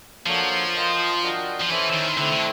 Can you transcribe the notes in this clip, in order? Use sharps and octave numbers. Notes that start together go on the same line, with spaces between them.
F3 A#3 D4 F#4 A4 C#5
F4 A#4 D#5 G5
D4 F#4 A#4 D#5 G5
F3
E3 C#4 E4 A4 C5 E5
D#3
D3 A3 C4 E4
D3